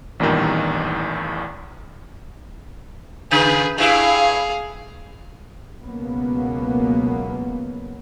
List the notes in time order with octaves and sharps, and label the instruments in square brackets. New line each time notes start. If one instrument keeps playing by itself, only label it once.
[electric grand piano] A1 E2 G2 A#2 D#3
[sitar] C#3 [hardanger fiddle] G#4 B4
[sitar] G2 E4 [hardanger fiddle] G#4 F5
[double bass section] C#2 B2 F#3 A#3 B3